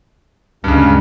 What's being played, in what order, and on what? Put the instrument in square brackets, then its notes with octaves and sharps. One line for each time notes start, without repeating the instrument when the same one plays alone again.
[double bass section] D2 G3 G#3 [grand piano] G2 C#3